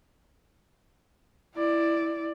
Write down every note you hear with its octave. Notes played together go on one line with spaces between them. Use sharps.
E4 D5